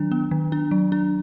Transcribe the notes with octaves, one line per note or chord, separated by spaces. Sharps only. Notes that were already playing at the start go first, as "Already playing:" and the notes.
Already playing: D#3 F#3 D4
B3
D#3
D4
F#3
D4